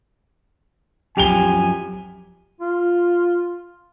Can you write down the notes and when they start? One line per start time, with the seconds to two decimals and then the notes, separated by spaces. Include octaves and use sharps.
1.17 F#2 F3 G4 G#5 F7 G7
2.61 F4